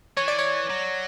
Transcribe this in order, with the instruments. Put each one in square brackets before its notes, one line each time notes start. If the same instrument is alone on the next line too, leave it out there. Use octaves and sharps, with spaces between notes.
[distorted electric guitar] E3 [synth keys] C#5
[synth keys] D5
C#5
[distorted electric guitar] F#3